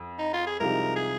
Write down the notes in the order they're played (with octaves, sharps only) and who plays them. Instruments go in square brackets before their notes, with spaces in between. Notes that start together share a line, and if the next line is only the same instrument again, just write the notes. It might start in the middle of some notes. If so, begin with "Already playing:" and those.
Already playing: [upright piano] F2
[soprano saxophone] D#4
F4
G#4
[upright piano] C2 C3 F3 G#3 D#4 [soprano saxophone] A#4
[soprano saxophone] G#4